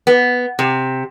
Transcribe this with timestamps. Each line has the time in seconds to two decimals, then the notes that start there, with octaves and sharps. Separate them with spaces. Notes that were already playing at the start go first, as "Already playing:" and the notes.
0.07 B3
0.59 C3